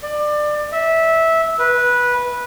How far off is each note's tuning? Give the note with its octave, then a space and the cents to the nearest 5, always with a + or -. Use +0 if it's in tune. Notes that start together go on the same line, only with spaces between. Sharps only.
D5 +25
E5 -15
B4 -15